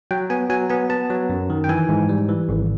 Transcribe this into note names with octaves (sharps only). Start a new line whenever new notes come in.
F#3 G5
B3 G#5
F#3 G#5
B3 G#5
B3 A5
F#3
F#2
D#3
G5
E3 G#5
G#2
G3
E3
G#1